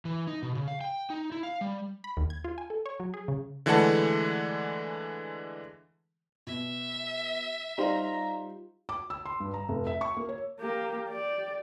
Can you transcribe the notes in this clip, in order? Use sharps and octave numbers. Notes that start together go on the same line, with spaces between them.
E3
D#4
B2
C#3
F5
G5
D#4
E4
F5
G3
B5
D#2
G#6
F4
G#5
A4
C#5
F#3
G#4
C#3
D3 E3 G#3 A3 F#5 A5
B2 E5
G3 D#4 F4 C5 A#5 C6
D6
E6
C6
G2
A#5
F1
E5
C#6
A#3
C#5
A#3 G4
G4 D5